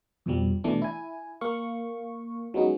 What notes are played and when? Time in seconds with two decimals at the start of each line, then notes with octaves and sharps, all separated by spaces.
0.26 F2 B2 F3 G3
0.64 B2 E3 A3 D4
0.82 E4 G#5
1.41 A#3 F5 C#6
2.54 F#3 G#3 B3 C#4 D#4